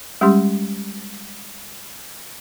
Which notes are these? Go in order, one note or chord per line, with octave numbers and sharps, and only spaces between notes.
G3 G#3 C#4 G4 C6